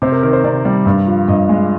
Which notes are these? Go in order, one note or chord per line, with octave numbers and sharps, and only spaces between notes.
C3 C5
A#4
D#3 A#4
C5
C3 D5
G3
G2
F3
G2 D#5
G#3